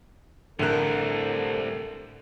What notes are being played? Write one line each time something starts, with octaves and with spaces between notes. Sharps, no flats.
C2 A2 D3 A4 A#4 F#6